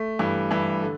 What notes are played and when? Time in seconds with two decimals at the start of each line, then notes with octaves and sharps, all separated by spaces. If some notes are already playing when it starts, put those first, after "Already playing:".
Already playing: A3
0.19 G2 E3
0.51 G2 E3
0.82 D3